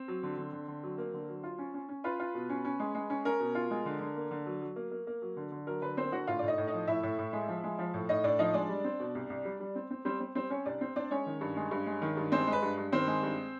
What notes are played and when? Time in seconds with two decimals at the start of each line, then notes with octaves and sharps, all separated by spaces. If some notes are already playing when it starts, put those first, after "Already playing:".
Already playing: C4
0.08 F#3
0.23 D3
0.37 D3
0.53 D3
0.68 D3
0.83 F#3
0.98 A#3
1.13 D3
1.28 F#3
1.43 F4
1.58 C#4
1.74 C#4
1.89 C#4
2.04 F4 B4
2.20 F4
2.34 B2
2.49 C#4
2.65 C#4
2.80 G#3
2.95 G#3
3.10 C#4
3.25 C#4 A#4
3.40 B2
3.55 F4
3.71 G#3
3.86 D3
4.01 D3
4.16 A#3
4.31 D3
4.46 F#3
4.61 F#3
4.76 A#3
4.91 A#3
5.07 A#3
5.22 F#3
5.37 D3
5.52 D3
5.67 F#3 A#4
5.82 D3 B4
5.97 A#3 C4 C5
6.12 D3 F#4 F#5
6.27 A2 F4 F5
6.39 A2 D5
6.48 D#4 D#5
6.58 A2
6.67 D#4 D#5
6.73 F3
6.87 A2 E4 E5
7.03 A2
7.18 A2
7.33 G#3
7.48 F3
7.64 G#3
7.79 F3
7.94 A2
8.09 A2 D#4 D#5
8.24 A2 D4 D5
8.39 F3 D#4 D#5
8.54 G#3 D4 D5
8.69 G3
8.84 C4
9.00 B2
9.15 C2
9.30 C2
9.45 G3
9.60 G3
9.75 C4
9.90 C4
10.05 G3 C4 C5
10.20 C4
10.35 G3 C4 C5
10.50 C4 C#4 C#5
10.66 C2 D4 D5
10.81 C4
10.96 C4 D4 D5
11.11 G#3 C#4 C#5
11.26 D#3
11.41 G2
11.56 G#3
11.71 G2
11.86 G#3
12.02 D#3
12.17 G2
12.32 G#3 C4 C5
12.47 G#3
12.52 B4
12.62 G2
12.77 G2
12.92 D#3 C4 C5
13.07 G#3
13.23 G2